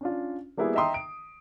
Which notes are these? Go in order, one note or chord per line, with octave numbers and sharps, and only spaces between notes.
C#4 D4 F4
G3 A#3 B3 E4 F#4 G#4
D#5 E5 G5 A#5 C6 D#6
D7